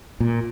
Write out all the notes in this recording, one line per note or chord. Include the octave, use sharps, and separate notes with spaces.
A#2